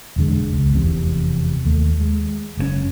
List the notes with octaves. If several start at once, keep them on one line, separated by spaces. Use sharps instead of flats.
E1 F2 D3 G#3
C#2
F1 E2 C3
D#2 A3
G#3
F#1 C3 C#4